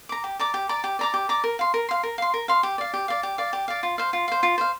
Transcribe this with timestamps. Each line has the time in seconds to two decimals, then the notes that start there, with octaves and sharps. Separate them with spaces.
0.09 A#5 D6
0.24 G4
0.39 D5 A#5 D6
0.54 G4
0.69 D5 A#5 D6
0.84 G4
0.99 D5 A#5 D6
1.14 G4
1.29 D5 A#5 D6
1.44 A#4
1.59 F5 C6
1.74 A#4
1.89 F5 C6
2.03 A#4
2.18 F5 C6
2.34 A#4
2.48 F5 C6
2.63 G4
2.78 D5 F5
2.94 G4
3.08 D5 F5
3.23 G4
3.38 D5 F5
3.53 G4
3.68 D5 F5
3.83 F4
3.98 C5 F5
4.13 F4
4.28 C5 F5
4.43 F4
4.58 C5 F5